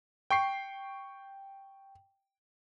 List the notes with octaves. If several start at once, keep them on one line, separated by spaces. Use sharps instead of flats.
G5 C#6 C7